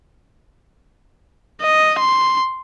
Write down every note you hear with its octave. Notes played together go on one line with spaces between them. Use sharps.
D#5
C6